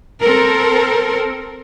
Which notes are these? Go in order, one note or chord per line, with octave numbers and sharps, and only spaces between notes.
C4 A4 A#4